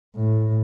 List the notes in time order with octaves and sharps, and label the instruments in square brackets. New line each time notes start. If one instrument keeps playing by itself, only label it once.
[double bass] A2